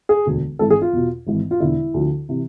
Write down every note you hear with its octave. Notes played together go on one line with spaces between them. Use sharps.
G#4
E1 D2 D3
G#1 G#2 E3 A4
G#4
F4
E2 B2
G#1 G#2 E3
F4
E1 E2 D3 E4
D2 D3 F3
C3 E3